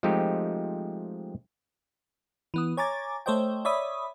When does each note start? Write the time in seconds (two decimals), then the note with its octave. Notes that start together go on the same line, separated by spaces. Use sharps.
0.03 F3 G#3 A3 C4 D#4 G4
2.54 E3 B3 D#6
2.77 C#5 G#5 A#5 D6 A6
3.26 A3 A4 C5 C#5 D#5 G5
3.65 C#5 D5 E5 B5 D#6